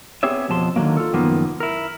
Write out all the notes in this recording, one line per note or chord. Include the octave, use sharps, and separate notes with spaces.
B3 C4 G4 G#4 C#5 E5
F2 B2 F3 A5 C6
D3 D#3 F3 F#3 A#3
F4 A4
C#2 F#2 D#3 F3 A#3 B3
E4 A#4